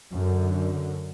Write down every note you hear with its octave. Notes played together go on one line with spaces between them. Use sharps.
F#2 D3